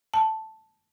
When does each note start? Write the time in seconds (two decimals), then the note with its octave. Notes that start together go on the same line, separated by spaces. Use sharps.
0.14 A5